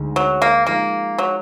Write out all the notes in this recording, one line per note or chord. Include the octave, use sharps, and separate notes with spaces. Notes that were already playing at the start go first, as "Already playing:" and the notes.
Already playing: D2 D3 G#3 D#4 G#4
F#3
A#3
F3 G#3 A#3 D#4
F#3